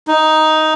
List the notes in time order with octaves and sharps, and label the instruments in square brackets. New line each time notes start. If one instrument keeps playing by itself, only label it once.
[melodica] D#4